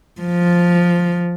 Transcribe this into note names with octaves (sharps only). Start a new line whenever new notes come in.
F3